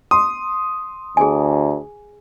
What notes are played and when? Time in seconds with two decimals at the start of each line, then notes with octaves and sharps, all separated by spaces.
0.11 C6 D#6
1.17 D2 G#4 G#5